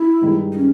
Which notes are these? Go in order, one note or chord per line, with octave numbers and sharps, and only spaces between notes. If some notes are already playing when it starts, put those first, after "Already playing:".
Already playing: E4
G2 D#3 G#3
D#4
C#4